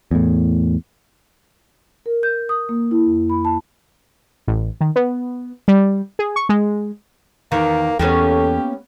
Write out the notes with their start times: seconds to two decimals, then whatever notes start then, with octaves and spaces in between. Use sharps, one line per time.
0.11 E2 A2
2.06 A#4
2.23 G6
2.49 D#6
2.69 A#3
2.91 E4
3.06 F2
3.30 B5
3.45 A5
4.48 A1
4.81 D#3
4.96 B3
5.68 G3
6.19 G#4
6.36 C#6
6.49 G#3
7.52 E2 D#3 A#3
7.99 E2 A#3 B3 C#4 G4 A4